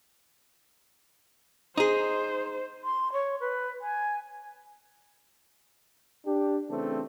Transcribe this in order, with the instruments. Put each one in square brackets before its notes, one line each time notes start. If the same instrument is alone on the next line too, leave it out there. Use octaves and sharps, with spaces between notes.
[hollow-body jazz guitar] D#4 G#4 [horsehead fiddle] C5
[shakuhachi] C6
C#5
B4
G#5
[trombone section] D4 G4
C#3 E3 A3 C4 D4